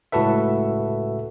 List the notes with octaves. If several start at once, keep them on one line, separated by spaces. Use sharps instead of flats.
C#2 A2 F#4 A4 B4 E5